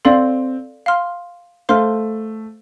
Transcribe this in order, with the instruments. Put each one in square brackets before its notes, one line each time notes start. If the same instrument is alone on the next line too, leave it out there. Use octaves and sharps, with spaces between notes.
[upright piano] C4 [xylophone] A4 D5 F5 C6
[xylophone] F5 C6 F6
[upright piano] A3 [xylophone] C5 F5 C6 F6